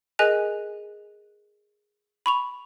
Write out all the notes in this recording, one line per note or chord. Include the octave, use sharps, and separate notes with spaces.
G#4 A#4 D#5 G#5 F#6 F7
B5 C#6 F7